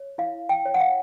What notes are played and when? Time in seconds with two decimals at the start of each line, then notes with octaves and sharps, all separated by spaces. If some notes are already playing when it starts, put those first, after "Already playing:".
Already playing: C#5
0.18 E4 F5
0.49 G5
0.65 C#5
0.74 F#5
0.80 F5